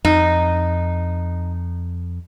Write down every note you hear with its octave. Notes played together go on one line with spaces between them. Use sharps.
F2 D#4